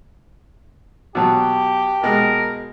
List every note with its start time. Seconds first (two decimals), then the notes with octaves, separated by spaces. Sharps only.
1.15 B2 F#3 G4 A5 D6
2.03 B2 G#3 A#4